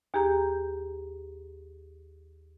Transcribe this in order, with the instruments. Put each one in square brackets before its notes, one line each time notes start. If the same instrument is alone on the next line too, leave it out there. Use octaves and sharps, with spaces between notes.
[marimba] D#2 G4 G#4 A#5 G6